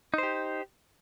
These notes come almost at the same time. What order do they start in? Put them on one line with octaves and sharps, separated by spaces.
D#4 C5 G4